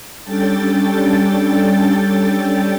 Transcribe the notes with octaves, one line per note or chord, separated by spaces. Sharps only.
G3 C#4 D4 A4 G5 A6